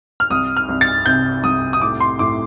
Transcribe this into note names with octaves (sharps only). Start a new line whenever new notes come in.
F6
C2 D#6
F6
C2
A6
C3 G6
C2 D#6
D#6
A2 D6
C6
A2 D6